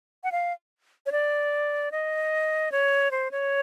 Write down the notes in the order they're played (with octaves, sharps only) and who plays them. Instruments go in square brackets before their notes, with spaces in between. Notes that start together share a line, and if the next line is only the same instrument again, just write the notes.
[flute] F#5
F5
C#5
D5
D#5
C#5
C5
C#5